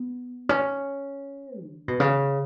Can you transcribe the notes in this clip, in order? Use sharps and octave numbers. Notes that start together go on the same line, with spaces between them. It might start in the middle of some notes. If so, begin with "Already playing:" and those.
Already playing: B3
C#4
D3
B2
C#3